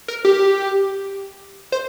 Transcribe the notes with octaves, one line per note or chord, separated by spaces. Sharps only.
A#4
G4
C5